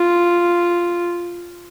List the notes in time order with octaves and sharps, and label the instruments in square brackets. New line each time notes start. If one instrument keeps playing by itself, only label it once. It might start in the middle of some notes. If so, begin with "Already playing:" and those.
Already playing: [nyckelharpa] F4